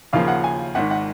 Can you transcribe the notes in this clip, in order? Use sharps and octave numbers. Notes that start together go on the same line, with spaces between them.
D#2 C#3 F3 A#3 F5
F#5
G#5
G#1 G#2 D#3 F#5
F#5